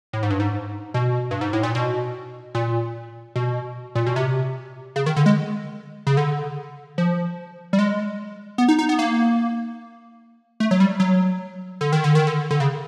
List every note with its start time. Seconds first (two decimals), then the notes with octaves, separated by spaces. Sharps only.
0.13 A2
0.23 G#2
0.31 G2
0.40 G#2
0.94 B2
1.31 G2
1.41 G#2
1.53 A2
1.63 A#2
1.75 B2
2.55 A#2
3.36 B2
3.95 A#2
4.06 B2
4.16 C3
4.96 C#3
5.06 D#3
5.16 D3
5.26 G#3
6.07 C#3
6.17 D3
6.98 F3
7.73 G3
7.79 G#3
8.58 B3
8.68 D#4
8.79 D#4
8.89 B3
8.99 A#3
10.60 A3
10.71 F#3
10.80 G3
11.00 F#3
11.81 D3
11.93 D#3
12.04 D3
12.15 D#3
12.27 D3
12.51 D3
12.60 C#3